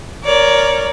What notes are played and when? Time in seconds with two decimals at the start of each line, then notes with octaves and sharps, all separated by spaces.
0.23 A#4 C#5 D5